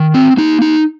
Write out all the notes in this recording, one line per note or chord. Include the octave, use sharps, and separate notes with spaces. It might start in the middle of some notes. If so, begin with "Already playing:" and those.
Already playing: D#3
C4
A#3 D#4
D#4